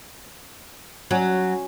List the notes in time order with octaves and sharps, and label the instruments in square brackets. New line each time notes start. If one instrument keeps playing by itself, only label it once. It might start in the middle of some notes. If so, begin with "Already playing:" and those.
[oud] F#3 [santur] C#4 F#4